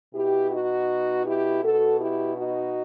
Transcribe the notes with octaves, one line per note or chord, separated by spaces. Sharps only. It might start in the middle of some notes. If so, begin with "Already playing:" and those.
B2 E4 G4
D#4 F#4
E4 G4
B2 F#4 A4
E4 G4
D#4 F#4